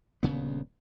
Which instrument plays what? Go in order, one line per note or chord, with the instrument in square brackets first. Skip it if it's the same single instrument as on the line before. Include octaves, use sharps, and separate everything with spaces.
[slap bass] D#1 D2 C#3 B3